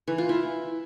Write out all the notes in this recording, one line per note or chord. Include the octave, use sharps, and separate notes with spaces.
E3
F4
E4